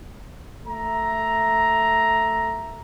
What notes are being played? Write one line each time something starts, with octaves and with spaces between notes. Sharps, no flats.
A3 E5 A#5